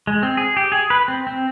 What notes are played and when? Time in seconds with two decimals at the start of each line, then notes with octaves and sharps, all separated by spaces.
0.07 G#3
0.23 C4
0.37 G#4
0.57 G4
0.72 G#4
0.90 B4
1.08 C4
1.27 C4